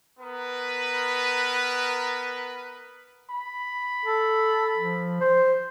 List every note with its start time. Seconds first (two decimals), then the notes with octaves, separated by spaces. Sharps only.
0.20 B3 A#4 B4
3.30 B5
4.05 A4
4.77 F3
5.21 C5